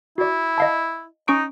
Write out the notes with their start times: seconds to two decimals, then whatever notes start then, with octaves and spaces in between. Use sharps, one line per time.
0.18 E4 F#4 D5
0.58 D#5 F5 A5
1.28 C#4 D#4 C#6 D7